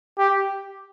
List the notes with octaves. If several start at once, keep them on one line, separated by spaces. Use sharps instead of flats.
G4